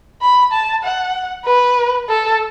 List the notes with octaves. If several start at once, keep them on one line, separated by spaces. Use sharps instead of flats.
B5
A5
F#5
B4
A4